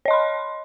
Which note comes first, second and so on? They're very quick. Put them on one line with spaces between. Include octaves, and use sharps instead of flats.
C#5 D#5 C6 B5